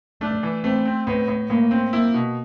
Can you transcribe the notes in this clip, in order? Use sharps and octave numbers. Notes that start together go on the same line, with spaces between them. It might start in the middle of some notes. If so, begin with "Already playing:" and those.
A3 D4
E3
A3 C4
C4
A2 B3
A2
A2 A#3
C4
A#3 E4
B2